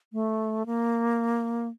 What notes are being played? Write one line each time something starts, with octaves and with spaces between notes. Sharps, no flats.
A3
A#3